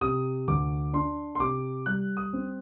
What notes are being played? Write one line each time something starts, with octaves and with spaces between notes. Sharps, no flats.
C3 D#6
D2 D6
D4 C6
C6
C3 D6
G3 F#6
D#6
C4